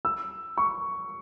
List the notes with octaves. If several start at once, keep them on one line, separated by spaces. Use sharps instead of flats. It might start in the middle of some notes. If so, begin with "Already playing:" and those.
E6
C#6